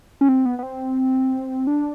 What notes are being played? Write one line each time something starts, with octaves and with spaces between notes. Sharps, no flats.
C#4
C4
B3
B3
C4
D4